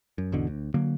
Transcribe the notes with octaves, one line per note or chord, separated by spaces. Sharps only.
F#2
G#1 E2 B2 D3
D2
D3 F#3 A#3